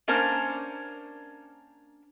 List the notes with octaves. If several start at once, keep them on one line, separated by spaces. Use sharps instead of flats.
A#3 C#4 D4 A#4 C5